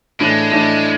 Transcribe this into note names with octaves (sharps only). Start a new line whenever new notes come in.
A2 E3 G#3 A3 D4
A2 E3 A3 D4